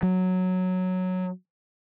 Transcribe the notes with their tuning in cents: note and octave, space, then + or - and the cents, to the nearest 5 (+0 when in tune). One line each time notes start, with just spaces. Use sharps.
F#3 -5